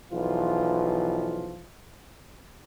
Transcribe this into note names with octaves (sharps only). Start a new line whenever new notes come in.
B1 E3 F3 F4